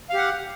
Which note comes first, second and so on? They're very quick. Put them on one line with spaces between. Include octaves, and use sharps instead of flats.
F5 G4 F#5